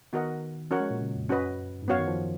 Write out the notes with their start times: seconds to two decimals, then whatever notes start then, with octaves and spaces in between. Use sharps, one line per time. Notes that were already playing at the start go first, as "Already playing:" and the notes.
0.13 D#3 B3 F#4 A#4 D#5 F#5
0.71 F3 C#4 F#4 A#4 C#5 F#5
0.80 G#3
0.90 A#2
1.01 C#3
1.15 F2
1.29 F#2 C#4 F#4 B4 D#5
1.82 G#2
1.88 F#2 B3 F#4 C#5 F5
1.99 D#3
2.07 F3